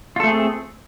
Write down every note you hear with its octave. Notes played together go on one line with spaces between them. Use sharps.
A3 C4 F4 G#4 A4